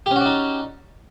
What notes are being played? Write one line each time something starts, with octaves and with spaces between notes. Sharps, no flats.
C#4 D#4 F#4 G4 D5